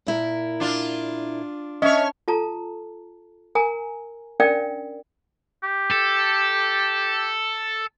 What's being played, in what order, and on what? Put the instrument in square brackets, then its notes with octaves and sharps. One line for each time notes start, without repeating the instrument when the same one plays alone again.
[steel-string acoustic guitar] A#2 E4 A#4
[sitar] D4 F4
[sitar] C#4 C#5 [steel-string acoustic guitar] D4 [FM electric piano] D#5 E5
[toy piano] F4 A4 A5 A#5
A#4 G#5 A#5
C#4 D4 A#4 D5 F5 G5
[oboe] G4
[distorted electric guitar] A4